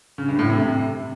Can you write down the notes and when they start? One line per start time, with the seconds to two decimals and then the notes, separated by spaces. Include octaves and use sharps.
0.18 C#3
0.28 G2
0.39 A2
0.49 C3
0.59 C3